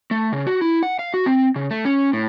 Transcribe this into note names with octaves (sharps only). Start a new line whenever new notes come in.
A3
C#3
F#4
E4
F#5
F5
F#4
C4
C#3
A3
C#4
A2